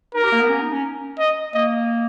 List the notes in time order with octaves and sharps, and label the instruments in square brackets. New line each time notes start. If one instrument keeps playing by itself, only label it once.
[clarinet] D#4 [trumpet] A#4
[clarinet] G4
A#3
B3
C#4
D#4
C#4
[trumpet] D#5
[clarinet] A#3 [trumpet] D#5